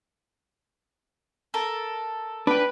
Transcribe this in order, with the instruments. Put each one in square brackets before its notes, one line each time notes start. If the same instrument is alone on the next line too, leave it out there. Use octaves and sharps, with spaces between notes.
[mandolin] A4 A#4
[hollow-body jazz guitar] D4 G5 [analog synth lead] B4